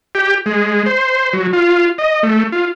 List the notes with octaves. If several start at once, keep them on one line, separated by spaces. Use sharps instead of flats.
G4
G#3
C5
F#3
F4
D#5
A3
F4